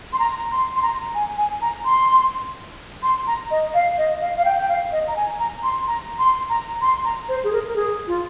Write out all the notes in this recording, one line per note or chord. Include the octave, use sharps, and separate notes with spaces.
C6
A#5
C6
C6
A#5
G#5
G#5
A#5
C6
C6
A#5
D#5
F5
D#5
F5
F5
G5
G5
F5
D#5
A#5
G#5
A#5
C6
A#5
C6
A#5
C6
A#5
C5
G#4
A#4
A#4
G#4
F4